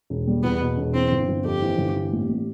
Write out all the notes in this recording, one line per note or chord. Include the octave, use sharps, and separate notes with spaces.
E1
G3
E2 B3
B2
E1
E3 C4
G1
G1
F2 G4
E3
G1
E3
A1
A1